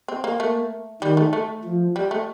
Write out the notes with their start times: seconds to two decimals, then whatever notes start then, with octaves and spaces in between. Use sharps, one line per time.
0.08 C4
0.24 A#3
0.39 A3 A#3
1.02 D#3 G3
1.17 A3
1.33 A3
1.64 F3
1.96 G3
2.11 A3